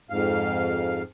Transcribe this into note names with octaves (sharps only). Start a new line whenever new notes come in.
F2 G#2 F5